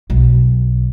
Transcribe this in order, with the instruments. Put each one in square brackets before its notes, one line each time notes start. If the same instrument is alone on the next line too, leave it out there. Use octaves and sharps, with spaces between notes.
[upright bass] B1